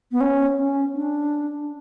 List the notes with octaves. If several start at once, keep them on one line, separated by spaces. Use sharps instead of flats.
B3
C#4
C#4
D4